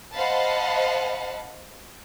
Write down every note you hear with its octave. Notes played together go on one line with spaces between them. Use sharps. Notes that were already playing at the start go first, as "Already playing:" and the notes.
C5 D#5 F5 F#5 A5 B5